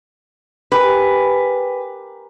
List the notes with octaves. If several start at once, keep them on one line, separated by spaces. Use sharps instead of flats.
G4 A#4 B4 G#5